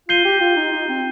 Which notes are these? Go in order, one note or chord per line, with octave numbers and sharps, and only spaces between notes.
F4 G6 C7 D#7 G7
G4
F4
D#4
D#4
C4